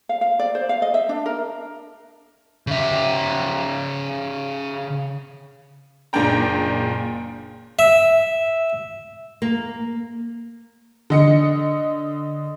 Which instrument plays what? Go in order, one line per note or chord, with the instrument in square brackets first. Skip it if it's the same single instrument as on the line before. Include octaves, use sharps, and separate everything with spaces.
[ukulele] F5
F5
D5
C5
F5
D#5
E5
D4
A#4
[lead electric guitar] C#3 E5
[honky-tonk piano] F#1 A#2 G#3 D4 G5 A#5
[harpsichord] E5
[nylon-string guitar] A#3
[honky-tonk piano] D3 D#5 C#7